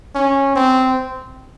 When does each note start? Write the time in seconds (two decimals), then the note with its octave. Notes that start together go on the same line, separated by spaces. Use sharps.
0.15 C#4
0.56 C4